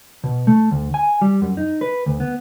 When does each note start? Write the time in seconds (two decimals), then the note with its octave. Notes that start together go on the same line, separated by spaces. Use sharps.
0.24 B2
0.47 A3
0.71 D2
0.94 G#5
1.21 G3
1.42 F#2
1.57 D#4
1.81 B4
2.06 D2
2.20 B3